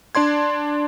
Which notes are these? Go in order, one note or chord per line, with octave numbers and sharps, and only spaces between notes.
D4 D5 C6 G#6